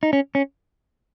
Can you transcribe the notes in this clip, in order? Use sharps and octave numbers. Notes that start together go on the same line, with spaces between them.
D#4
C#4
C#4